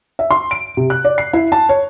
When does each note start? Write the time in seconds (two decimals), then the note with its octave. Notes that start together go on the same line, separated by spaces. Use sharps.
0.19 E5
0.31 C6
0.51 D7
0.77 C3
0.90 F#6
1.04 D5
1.18 C7
1.33 E4
1.52 A5
1.69 C#5